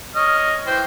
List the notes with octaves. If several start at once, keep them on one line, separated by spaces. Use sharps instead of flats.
C#5 D#5 F6
E3 C5 G5